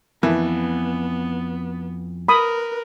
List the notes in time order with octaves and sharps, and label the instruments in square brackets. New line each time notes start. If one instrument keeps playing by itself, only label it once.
[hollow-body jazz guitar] F2 [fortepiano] E3 [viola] B3
[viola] A#4 B4 [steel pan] B5 D#6